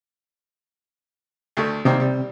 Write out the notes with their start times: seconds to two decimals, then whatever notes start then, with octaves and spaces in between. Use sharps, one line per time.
1.57 D2 A3
1.85 C3 D#3 G3 A#3 C4
2.00 G3